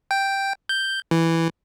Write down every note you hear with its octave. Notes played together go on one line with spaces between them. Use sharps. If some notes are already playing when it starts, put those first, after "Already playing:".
G5
G6
E3